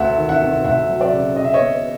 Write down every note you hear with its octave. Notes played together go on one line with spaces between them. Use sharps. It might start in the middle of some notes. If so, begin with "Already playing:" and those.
Already playing: D2 E5 F#5
D#3
E5 F#5
C3
D2 E5 F#5
F#3
D5 E5
C#3
C#3 D#5
E5
C#5 D#5
B3